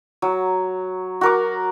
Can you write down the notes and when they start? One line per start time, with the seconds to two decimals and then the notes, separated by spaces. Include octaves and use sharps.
0.22 F#3
1.21 F#4 A#4 D6